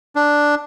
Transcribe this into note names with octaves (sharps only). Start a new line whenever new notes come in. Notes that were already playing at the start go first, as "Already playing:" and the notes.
D4